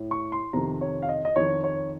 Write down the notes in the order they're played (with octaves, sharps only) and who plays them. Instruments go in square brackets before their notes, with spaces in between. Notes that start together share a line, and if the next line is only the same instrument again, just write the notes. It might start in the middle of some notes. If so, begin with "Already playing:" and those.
Already playing: [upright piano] A2
C#6
C6
F2 C3 D#3 A#5
C#5
F5
D#5
D#5
F2 D#3 C#5
C#5